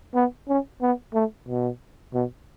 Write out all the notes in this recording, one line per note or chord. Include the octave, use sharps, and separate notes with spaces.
B3
C#4
B3
A3
B2
B2